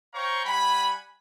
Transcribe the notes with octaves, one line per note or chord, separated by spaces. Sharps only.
C5 C#5 F5 G5 A#5 C#6
G3 F#5 G#5 B5